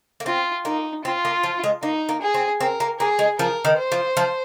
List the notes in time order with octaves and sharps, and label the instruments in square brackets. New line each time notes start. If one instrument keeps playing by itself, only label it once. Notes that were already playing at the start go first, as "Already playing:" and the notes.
[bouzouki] A#3
[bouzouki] C4 [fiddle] F4
[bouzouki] A#3 [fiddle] D#4
[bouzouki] C4 [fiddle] F4
[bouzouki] A#3
F3
G#3
[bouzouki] A#3 [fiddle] D#4
[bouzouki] A#3
[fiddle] G#4
[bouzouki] C4
[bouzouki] C4 [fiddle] A#4
[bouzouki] A#3
[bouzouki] A#3 [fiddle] G#4
[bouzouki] G#3
[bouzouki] F3 [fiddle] A#4
[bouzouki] D#3
[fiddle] C5
[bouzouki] F3
F3